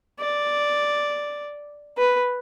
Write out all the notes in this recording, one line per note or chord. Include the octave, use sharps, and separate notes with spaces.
D5
B4